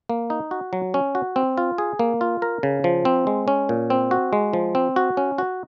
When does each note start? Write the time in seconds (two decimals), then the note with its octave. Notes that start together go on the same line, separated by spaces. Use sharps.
0.09 A#3
0.30 D#4
0.51 F#4
0.73 F#3
0.94 C#4
1.15 F#4
1.36 C4
1.58 F4
1.78 G#4
1.99 A#3
2.21 F4
2.42 A#4
2.63 C#3
2.84 F3
3.05 C4
3.27 G#3
3.48 C#4
3.69 A#2
3.90 C4
4.11 F#4
4.33 G#3
4.53 F3
4.75 C4
4.96 F#4
5.17 C#4
5.38 F#4